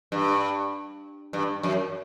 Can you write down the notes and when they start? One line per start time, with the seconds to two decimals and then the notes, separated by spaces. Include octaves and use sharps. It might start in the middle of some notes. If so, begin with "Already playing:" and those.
0.12 G2
1.33 G2
1.63 F#2